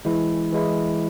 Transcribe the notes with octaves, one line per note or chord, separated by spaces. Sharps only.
E3 G#3 E4
E3 G#3 E4